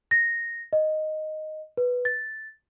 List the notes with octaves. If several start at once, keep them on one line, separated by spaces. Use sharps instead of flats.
A#6
D#5
B4
A6